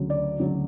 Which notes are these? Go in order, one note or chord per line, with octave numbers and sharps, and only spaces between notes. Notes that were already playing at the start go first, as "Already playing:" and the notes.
Already playing: D2 C#3 F#3
D5
D2 C#3 F#3